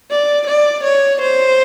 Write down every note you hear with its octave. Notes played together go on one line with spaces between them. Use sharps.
D5
D5
C#5
C5